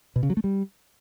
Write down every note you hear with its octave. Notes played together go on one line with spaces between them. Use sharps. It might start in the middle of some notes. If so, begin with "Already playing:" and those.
B2
C#3
F#3
A3
G3